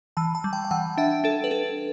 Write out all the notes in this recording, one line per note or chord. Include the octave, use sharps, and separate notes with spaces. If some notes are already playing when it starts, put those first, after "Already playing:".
E3 A5
A5
G3
G5
G5
E3 F#5
D4 E5
D4 A4
B4
D4 A4